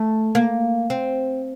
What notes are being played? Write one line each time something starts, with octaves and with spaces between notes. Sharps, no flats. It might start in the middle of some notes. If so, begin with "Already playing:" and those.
Already playing: A3
A#3
C4